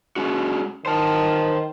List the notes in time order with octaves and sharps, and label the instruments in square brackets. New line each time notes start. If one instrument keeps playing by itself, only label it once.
[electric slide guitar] G#3 C#4 F#4
[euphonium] D#3 [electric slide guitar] C5 A5